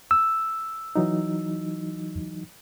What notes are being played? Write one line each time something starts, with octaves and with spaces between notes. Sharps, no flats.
E6
E3 F#3 D#4